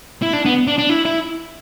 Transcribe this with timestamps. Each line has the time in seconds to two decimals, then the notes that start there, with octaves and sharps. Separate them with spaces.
0.22 E4
0.33 D4
0.45 B3
0.67 D4
0.78 D4
0.89 E4
1.05 E4